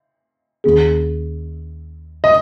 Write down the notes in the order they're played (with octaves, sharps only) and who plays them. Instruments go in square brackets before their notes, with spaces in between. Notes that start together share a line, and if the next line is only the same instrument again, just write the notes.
[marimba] D#2 D#3 A#3 C#4 G#4
[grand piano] D#5